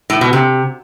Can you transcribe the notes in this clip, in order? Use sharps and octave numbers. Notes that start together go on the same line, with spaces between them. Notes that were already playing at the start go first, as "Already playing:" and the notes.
A2
B2
C3